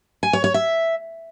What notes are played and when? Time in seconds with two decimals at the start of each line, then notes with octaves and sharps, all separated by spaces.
0.23 G#5
0.33 C#5
0.44 C#5
0.54 E5